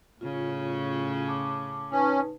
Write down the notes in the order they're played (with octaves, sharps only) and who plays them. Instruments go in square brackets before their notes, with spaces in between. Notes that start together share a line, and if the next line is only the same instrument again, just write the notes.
[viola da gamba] A2 C#3 C#4 [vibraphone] F4
[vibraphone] A5 D6
[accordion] C#4 [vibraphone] D#4 B4 A5